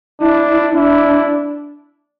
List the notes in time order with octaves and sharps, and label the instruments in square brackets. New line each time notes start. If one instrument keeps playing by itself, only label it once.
[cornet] D4 [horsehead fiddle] E4
[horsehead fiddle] D4 [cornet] E4